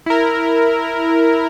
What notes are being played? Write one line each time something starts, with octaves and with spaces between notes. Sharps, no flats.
E4 A#4